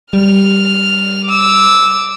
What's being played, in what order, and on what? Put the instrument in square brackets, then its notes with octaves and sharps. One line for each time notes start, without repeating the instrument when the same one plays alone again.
[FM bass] G3 [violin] F6 F7
[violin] D6 E6